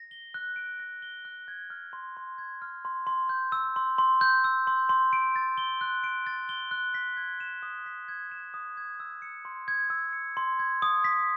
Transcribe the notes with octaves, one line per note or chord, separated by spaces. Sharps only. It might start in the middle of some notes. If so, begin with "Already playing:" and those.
Already playing: A#6
G7
F#6
D7
A#6
G7
F#6
G#6
F6
C6
C6
G#6
F6
C6
C6
G6
E6
C6
C6
G6
E6
C6
C6
D7
A6
G7
F#6
D7
A6
G7
F#6
B6
G#6
E7
D#6
B6
G#6
E7
D#6
G#6
E6
C#7
C6
G#6
E6
C#7
C6
G#6
D#6
B6